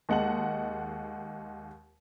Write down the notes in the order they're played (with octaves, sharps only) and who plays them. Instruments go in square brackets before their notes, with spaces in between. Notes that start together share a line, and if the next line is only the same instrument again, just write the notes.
[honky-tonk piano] D#2 G#3 F#5 A5 F#7